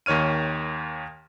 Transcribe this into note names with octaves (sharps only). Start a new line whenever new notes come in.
D#2 D#3 C#5 F6 D#7